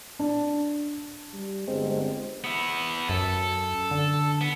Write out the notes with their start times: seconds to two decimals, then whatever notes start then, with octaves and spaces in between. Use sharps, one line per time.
0.19 D4
1.33 G3
1.68 G1 G#3 C4
2.44 B3 E4
3.09 F#2 A4
3.91 D3
4.41 B3